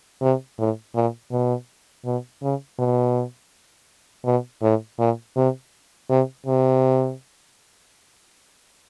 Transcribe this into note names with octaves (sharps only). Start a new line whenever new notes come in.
C3
A2
A#2
B2
B2
C#3
B2
B2
A2
A#2
C3
C3
C3